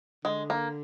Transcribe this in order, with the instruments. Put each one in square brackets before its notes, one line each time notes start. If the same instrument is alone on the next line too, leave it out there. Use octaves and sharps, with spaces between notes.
[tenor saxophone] D3 [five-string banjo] G#3
[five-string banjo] A#3